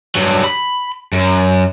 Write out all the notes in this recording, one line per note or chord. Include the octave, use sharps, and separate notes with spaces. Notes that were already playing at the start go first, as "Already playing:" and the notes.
G2 F#3
B5
F#2